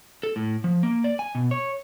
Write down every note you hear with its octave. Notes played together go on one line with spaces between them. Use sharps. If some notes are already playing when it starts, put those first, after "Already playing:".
A4
A2
F3
A#3
D5
G#5
B2
C#5